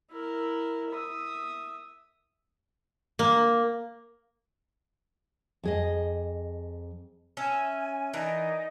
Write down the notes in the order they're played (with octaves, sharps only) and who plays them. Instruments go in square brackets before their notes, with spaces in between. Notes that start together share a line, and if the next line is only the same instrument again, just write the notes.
[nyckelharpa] E4 A#4
E5 D#6
[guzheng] A#3
[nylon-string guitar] F2 G#4 D#5
[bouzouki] C#4 E5 [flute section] G#5
[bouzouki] E3 A#4 [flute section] D#4 D5 D#5